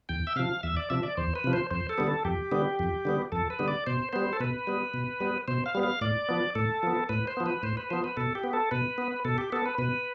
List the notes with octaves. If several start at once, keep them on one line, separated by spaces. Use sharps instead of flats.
E2 G5
E5
C3 F3 F5
E2 E5
D5
C3 F3 E5
D5
E2 C5
B4
C3 F3
C5
F2 C5
A4
D3 G3 B3
A4
F2 G4
D3 G3 B3
F2
D3 G3 B3
F2 A4
B4
D3 G3 B3
D5
B2 C5
G3 B3 C5
A4
B2 B4
G3 B3
B2
G3 B3
B2 C5
F5
G3 B3
F5
A2 D5
F3 B3
A2 A4
F3 B3
A2 B4
C5
F3 B3
B4
A2 C5
B4
F3 B3 C5
B4
B2 A4
G4
B3
A4
B2 B4
B3
B2 A4
G4
B3 A4
B4
B2 B4